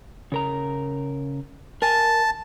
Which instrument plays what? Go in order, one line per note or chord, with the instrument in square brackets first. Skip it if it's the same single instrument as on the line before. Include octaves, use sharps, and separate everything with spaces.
[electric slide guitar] C#3 A#4 A#5
[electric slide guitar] A#4 G#5 [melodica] A5